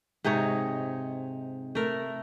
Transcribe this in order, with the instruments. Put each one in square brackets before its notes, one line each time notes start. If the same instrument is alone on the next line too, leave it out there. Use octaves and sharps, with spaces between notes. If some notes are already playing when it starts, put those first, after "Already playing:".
[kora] G#2 C3 D#4 C#5
A3 A#4